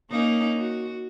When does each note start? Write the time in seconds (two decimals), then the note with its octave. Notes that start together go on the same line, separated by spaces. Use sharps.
0.11 A#3 C#4 D#4
0.57 F#4